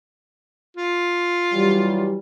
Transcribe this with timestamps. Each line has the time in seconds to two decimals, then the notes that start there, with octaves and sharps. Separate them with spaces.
0.77 F4
1.53 E3 F#3 G3